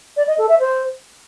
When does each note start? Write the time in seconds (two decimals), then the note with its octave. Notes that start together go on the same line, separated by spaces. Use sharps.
0.17 D5
0.27 D#5
0.38 A4
0.49 E5
0.60 C5